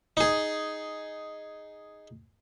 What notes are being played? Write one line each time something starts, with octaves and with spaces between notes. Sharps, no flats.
D#4 G#4